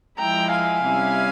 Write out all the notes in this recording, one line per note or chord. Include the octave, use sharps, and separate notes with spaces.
F3 G#3 E4 G5 A#5
F5 G#5
C3 G3 C#4 E4